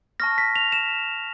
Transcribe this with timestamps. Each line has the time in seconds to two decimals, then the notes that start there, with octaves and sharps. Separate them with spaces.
0.20 A5 C#6 F6 A#6
0.38 B6
0.56 F7
0.72 E7